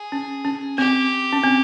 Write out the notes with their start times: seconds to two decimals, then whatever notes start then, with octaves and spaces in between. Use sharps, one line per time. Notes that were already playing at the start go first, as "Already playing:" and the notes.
Already playing: G#4
0.12 C#4
0.45 C#4
0.78 C4 G4
1.33 C#4
1.44 C4